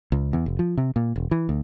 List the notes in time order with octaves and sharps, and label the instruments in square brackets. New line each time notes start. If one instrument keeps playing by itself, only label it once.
[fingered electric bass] C#2
E2
F1
F3
C3
A#2
E1
E3
D2